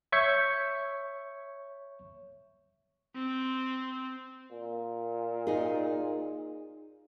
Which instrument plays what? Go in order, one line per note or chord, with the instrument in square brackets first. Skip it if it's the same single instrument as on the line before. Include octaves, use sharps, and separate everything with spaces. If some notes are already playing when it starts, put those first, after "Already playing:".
[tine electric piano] C#5 E5 C#6 G6 G#6 C#7
[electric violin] C4
[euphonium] A#2
[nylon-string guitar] D#4 G#4